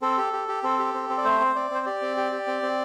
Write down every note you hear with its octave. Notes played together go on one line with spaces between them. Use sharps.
C4 A4
G4
G4
G4
C4 A4
G4
C4
C4
D5
A3 C5
C4
C4 D5
C4 C5
G4 D5
C4
G4
G4
C4
C4